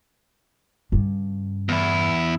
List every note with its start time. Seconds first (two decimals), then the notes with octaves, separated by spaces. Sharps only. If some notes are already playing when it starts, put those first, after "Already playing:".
0.92 G2 C#3
1.69 E2 E4